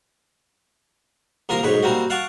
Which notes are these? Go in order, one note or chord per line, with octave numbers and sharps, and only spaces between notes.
C2 A#3 F4 A#4 A#5
B1 G#2 B4 C#5
G3 A#3 C4 F#4
F5 F#5 A5 C#6 D6